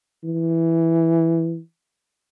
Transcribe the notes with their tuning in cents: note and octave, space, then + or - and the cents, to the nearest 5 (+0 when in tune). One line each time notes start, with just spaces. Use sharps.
E3 +0